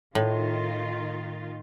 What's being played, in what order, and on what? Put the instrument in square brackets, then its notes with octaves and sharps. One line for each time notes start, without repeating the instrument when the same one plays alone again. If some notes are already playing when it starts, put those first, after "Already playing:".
[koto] A2 [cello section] D#3 F4